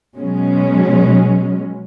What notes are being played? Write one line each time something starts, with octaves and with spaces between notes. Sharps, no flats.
B2 F#3 G#3 C#4